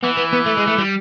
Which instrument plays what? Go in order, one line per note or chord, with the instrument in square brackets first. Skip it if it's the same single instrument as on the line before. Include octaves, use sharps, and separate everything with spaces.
[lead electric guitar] E3 [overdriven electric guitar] B3
[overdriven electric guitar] B3
B3
A3
G#3
A3
G3